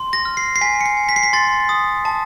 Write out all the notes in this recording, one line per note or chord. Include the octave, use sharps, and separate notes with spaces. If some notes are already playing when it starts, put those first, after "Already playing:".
Already playing: C6
A#6
F6
C7
C7
G#5 B6
C#7
C7
G#5
B6
C7
B6
C6 A6
D#6
A5